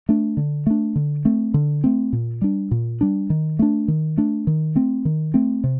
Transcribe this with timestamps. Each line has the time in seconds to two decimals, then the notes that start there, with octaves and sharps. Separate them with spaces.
0.09 A3 D4
0.37 D3
0.67 A3 D4
0.96 D3
1.25 A3 C4
1.54 D3
1.84 A3 C4
2.13 A#2
2.42 G3 D4
2.71 A#2
3.01 G3 D4
3.30 D#3
3.59 A3 D4
3.88 D#3
4.17 A3 D4
4.47 D#3
4.75 A3 C4
5.05 D#3
5.34 A3 C4
5.64 C3